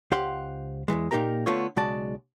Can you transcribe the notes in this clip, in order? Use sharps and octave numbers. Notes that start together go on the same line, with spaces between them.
C#2 G4 C5 F5 F#5 C6
E2 G2 E3 G#3
A#2 A#3 D#4 G4 A#4 A#5
D3 A3 B3 F4 A4 C#5
B1 C#3 G#3 F#4 D5 A5